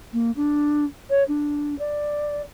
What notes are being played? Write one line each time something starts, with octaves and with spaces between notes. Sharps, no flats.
A#3
D4
C#5
D4
D5